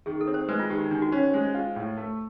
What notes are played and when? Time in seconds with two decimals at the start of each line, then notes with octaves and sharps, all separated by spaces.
0.06 D#3 G#4
0.21 A4
0.27 C4
0.34 C5
0.49 G#3 B4
0.59 F4
0.70 D#3 G4
0.80 D#4
0.91 D#3 D4
1.02 F#4
1.12 C#4 C5
1.23 C5
1.34 G#3 C5
1.55 F4
1.76 A2
1.97 A3